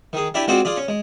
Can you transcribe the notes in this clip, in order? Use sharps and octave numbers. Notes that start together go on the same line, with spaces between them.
D#3 G#4
D4 E4 G4 D5 G#5
G#3 C4 F4 F#4 C5 D5
F4 G#4 D5
C#4
G#3